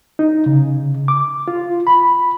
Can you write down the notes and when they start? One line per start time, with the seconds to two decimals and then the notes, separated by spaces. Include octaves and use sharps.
0.19 D#4
0.46 C#3
1.08 D6
1.48 F4
1.87 B5